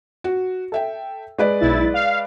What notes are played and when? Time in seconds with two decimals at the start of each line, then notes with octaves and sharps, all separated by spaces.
0.24 F#4
0.72 A4 E5 G5
1.38 G#3 B4 D5
1.60 B1 E4 A6
1.94 F5